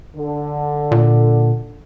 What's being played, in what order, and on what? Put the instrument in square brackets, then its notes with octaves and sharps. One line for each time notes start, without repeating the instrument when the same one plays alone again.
[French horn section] D3
[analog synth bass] A#2